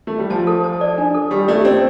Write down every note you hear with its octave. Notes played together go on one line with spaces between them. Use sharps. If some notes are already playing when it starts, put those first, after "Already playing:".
A3
G3
F3 A5
A4
A5
D5
D4
A4
G3 G4
A3 D5
C4 D5